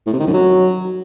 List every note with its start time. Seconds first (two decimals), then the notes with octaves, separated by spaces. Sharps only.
0.06 A2
0.13 C3
0.20 D#3
0.27 F#2
0.34 F#3